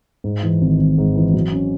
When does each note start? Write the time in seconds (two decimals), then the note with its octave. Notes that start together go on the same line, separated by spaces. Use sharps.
0.24 G#2
0.43 E3
0.62 G#1
0.79 G#1
0.98 G#2
1.15 E3
1.34 F#3
1.53 C#4